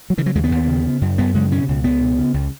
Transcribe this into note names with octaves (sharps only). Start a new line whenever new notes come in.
F#3
C#3 E3
F#3
D#2 G#3
B3
D#2
C#3
C#3
F#2
F#2 B3
C#3 G#3
B2 C#4
C#2
C#2 B3
B2
C#3
C#2